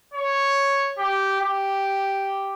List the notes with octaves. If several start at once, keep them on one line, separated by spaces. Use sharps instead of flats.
C#5
G4
G4